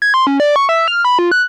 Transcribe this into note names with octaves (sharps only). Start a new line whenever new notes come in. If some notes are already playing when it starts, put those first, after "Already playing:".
G#6
C6
C#4
D5
C#6
E5
F6
B5
F4
F#6